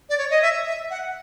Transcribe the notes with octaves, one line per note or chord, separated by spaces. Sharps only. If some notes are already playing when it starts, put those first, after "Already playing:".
D5
C#5
D#5
E5
E5
F#5